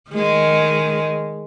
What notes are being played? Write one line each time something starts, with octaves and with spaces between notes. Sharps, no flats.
D#3 G#3